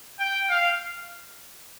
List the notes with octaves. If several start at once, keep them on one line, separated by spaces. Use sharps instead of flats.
G5
F5